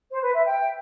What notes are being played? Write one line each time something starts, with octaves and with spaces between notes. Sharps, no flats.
C5
B4
E5
G5